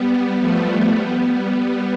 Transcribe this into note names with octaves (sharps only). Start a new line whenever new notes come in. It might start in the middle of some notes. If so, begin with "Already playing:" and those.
Already playing: G3 B3
F3 A3
G3 B3